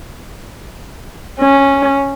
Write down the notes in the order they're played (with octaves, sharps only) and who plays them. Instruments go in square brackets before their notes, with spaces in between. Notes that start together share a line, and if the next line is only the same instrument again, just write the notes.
[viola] C#4